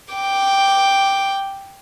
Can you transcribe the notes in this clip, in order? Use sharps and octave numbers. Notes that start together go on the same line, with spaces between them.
G5 D6